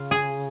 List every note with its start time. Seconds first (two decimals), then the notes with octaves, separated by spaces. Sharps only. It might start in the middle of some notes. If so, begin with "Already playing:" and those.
Already playing: C#3 F4
0.11 G#4